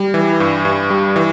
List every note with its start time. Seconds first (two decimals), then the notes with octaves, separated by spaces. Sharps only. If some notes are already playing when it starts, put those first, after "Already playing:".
Already playing: G3
0.14 E3
0.40 G2
0.65 G2
0.90 G3
1.16 E3